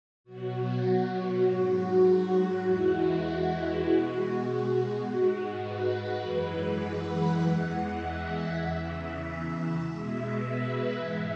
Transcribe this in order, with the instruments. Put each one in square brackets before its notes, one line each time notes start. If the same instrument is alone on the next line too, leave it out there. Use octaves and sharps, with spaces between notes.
[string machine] B2 F#3 F#4
G#2 F#3
E2 E3 G#3 E4
B2 G#3 F#4
F#4
G#2 G#3
B4
F#2 E3 G#3
F#5
E5
E2 E3 G#3 F#5
E5
E2 C#3 E3
B2 G#3
B4
G#2 E3 G#3 E5